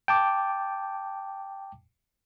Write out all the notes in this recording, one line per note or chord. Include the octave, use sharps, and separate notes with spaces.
G5 A5 D6